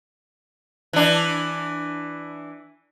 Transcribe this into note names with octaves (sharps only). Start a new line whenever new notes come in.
E3 D4